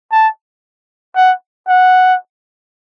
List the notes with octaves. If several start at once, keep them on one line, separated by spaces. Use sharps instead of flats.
A5
F#5
F#5